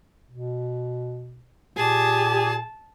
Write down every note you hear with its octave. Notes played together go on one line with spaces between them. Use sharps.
B2
A#2 G4 G#4 A5